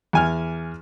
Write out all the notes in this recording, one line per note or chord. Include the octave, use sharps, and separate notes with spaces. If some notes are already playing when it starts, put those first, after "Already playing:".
E2 G#5 F6